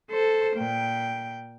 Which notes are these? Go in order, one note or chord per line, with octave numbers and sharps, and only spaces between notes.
A4 C5
A#2 G5